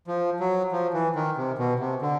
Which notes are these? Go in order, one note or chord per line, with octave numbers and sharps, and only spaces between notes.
F3
F#3
F3
E3
D#3
C3
B2
C3
D3